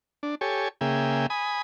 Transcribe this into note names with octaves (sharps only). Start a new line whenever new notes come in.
D4
G4 A4 C#5 G#5
C#3 A#3 G#4 E5 G5
G#5 B5 D#6